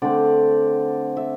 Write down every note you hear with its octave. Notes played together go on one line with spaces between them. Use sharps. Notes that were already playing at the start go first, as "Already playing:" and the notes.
D3 A3 C4 D5
E5